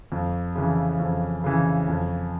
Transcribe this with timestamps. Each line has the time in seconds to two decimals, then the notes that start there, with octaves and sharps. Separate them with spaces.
0.12 F2
0.56 C#3 E3
1.00 F2
1.44 C#3 E3
1.88 F2